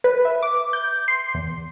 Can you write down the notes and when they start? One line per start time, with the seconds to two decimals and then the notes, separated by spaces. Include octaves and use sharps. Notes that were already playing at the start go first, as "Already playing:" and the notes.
0.04 B4
0.25 E5
0.43 D6
0.73 G6
1.08 C6
1.34 E2